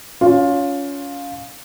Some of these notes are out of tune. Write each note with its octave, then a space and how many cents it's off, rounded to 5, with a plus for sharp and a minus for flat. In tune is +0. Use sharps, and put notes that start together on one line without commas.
C#4 +25 F4 +15